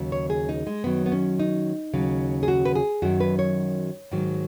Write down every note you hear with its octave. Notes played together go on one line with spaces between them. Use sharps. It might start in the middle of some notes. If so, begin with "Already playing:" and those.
Already playing: D#2 C#3 F#3
C#5
G#4
D#4
G#3
F#2 D#3 F#3 B3
B3
C#4
D#4
D#2 C#3 F#3
G#4
F#4
B4
G#4
F#2 D#3 F#3 F#4
B4
C#5
G#2 D#3 F#3